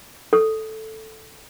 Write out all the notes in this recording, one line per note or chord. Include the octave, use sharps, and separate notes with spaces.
A4